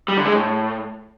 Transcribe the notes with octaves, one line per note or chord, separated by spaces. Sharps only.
G3
D3
G#3
A2